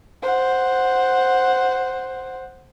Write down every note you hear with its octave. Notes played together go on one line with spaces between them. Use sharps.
C5 F#5